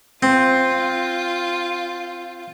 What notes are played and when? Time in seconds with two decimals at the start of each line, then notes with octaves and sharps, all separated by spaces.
0.23 C4 F4